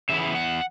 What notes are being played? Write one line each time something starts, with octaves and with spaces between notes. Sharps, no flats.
C#3 E3 B3 E4 E5
E2 F#5